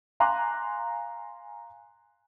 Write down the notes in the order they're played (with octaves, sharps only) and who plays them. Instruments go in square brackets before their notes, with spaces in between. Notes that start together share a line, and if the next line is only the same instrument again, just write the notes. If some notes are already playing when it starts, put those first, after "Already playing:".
[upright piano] F5 G#5 A#5 C6 D6 F#6